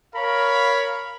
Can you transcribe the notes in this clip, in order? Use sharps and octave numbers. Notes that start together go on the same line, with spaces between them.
A#4 C#5 F5 B5